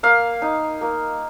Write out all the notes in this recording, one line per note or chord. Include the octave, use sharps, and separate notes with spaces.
A#3 F5
D#4
A#3